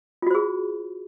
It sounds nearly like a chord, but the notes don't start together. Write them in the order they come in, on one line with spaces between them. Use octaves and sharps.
F4 F#4 C5 G#4